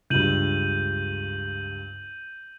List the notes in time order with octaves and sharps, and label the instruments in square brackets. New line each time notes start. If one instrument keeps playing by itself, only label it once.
[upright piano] C#2 G2 [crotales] G6 D#7 F#7